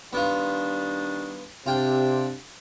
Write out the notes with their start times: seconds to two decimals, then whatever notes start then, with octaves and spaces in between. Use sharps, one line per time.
0.13 D#3 G3 B3 D4 F4
1.66 C3 D4 F4 G5